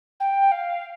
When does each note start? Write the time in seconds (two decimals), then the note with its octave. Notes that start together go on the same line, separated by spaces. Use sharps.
0.20 G5
0.52 F5